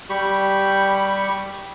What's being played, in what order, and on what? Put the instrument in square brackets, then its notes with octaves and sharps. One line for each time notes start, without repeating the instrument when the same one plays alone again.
[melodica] G3 G4 B5 C#6